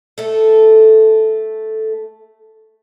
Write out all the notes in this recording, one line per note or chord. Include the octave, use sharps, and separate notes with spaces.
A3 A4